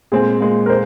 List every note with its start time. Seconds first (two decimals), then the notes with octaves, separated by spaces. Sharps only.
0.12 A#2 G#3 C4 G#4
0.40 A#2 G#3 C4
0.66 A#4
0.70 C5